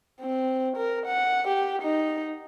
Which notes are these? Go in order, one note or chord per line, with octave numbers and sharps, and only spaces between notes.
C4
A#4
F#5
G4
D#4